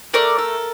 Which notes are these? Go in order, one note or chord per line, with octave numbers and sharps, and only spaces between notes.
A3 A#4 D5
A4